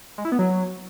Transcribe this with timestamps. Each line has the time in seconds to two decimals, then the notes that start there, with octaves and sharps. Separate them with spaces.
0.18 G#3
0.25 E4
0.32 B3
0.39 F#3